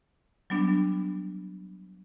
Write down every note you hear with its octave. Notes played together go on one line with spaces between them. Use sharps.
F#3 G3 B3 D4